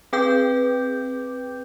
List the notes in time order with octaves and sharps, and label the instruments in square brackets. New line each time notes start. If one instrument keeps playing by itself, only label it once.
[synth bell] C4 G#4 B4 G5 D6 G6